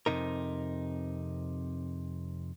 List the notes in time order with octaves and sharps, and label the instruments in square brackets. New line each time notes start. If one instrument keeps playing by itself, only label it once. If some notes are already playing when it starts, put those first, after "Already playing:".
[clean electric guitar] F2 G#2 C3 D#4 A#4